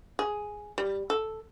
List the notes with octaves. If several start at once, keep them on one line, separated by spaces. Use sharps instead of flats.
G#4
G3
A4